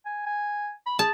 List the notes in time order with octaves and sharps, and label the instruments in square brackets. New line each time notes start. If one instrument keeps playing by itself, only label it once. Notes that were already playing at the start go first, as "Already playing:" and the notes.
[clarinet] G#5
G#5
B5
[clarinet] G#4 [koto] A5